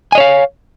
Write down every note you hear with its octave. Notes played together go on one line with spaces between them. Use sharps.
C#5 D#5 F5 G#5